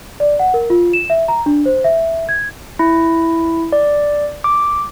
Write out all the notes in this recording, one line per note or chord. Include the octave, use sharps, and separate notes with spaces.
D5
F#5
A#4
F4
E7
E5
A#5
D4
C5
E5
G#6
E4
D5
D6